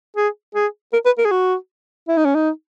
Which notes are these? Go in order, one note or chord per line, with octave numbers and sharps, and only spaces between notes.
G#4
G#4
A#4
B4
A#4
G#4
F#4
E4
D#4
C#4
D#4